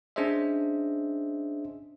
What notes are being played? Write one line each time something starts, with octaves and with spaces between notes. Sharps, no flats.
C#4 D4 G#4 C5 D#5 E5